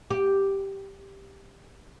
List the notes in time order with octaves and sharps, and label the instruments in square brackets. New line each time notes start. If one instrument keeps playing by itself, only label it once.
[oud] G4